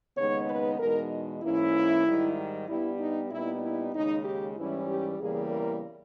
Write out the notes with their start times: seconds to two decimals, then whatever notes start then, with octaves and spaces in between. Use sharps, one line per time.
0.16 D#2 C#3 G#3 B3 D#4 C#5
0.48 B4
0.79 E2 B2 G#3 D#4 A#4
1.42 G#2 E3 A#3 C#4 E4
2.05 G#2 D#3 G3
2.67 G2 G3 B3 E4
2.99 D#4
3.30 A#2 G3 B3 D#4 E4
3.62 E4
3.93 D#2 C#3 G#3 D#4
4.25 G4
4.56 G#2 E3 G3 C#4 E4
4.87 G4
5.19 E2 C#3 E3 G3 A#3 G#4
5.50 A#4